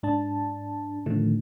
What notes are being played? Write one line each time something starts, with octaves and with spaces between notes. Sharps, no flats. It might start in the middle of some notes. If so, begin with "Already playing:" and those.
G#2 D4 A5
A2 D3 D#3 F3 A3